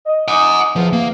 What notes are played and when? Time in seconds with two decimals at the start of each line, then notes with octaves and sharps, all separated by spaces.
0.06 D#5
0.28 D#4 F#5 G#5 D6 D#6
0.76 E2 F3
0.93 A#3